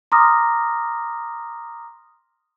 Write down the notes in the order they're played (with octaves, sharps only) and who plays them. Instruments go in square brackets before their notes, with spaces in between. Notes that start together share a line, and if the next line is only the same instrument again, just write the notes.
[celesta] A#5 C6 D6 D#6 F6 A#6